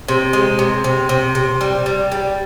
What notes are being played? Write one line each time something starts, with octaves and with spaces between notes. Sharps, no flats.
C3
G#3
C3
C3
C3
C3
G3
G3
G3